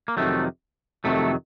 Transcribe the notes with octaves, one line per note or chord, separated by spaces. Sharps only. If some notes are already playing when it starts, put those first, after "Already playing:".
A#3
F2 C3 D#3 F#3 A3
F2 C3 D#3 F#3 A3